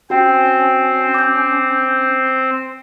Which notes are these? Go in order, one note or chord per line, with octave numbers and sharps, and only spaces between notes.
C4 C#4 F#4 C5 G5
D6 G6